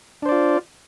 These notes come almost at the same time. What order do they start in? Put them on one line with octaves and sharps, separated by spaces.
D4 C5 D5 F4